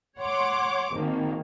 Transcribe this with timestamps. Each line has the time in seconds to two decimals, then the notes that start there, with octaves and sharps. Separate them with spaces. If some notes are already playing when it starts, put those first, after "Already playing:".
0.19 C#5 F#5 C6 D6
0.94 G#1 D#3 A#3